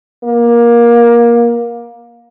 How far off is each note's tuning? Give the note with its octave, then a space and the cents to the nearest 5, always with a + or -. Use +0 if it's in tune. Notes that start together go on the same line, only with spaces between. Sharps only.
A#3 +20